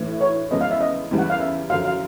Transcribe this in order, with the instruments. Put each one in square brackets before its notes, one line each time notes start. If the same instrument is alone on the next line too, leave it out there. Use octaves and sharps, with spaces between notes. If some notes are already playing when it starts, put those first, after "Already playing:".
Already playing: [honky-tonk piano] A2 E3 A3 D4
[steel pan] C#5
[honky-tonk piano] E2 C#3 F3 G#3 B3 [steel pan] D#5
[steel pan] F5
E5
D#5
[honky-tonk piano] E2 C#3 E3 G3
[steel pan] F#5
F5
E5
[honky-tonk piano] F#2 D3 F3 [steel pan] F5
[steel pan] F5